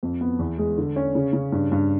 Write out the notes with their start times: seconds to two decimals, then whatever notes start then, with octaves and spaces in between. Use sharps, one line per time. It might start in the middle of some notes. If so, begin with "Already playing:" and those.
0.03 F2
0.21 B3
0.39 E2
0.58 G#3
0.78 D3
0.96 C#4
1.15 C#3
1.33 C#3
1.52 G2
1.72 G2